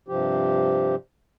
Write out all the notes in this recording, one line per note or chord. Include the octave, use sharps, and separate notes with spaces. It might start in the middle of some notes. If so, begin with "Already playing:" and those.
G2 C3 F3 G4